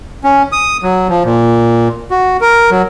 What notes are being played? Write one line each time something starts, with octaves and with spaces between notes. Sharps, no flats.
C#4
D#6
F#3
F3
A#2
F#4
A#4
F#3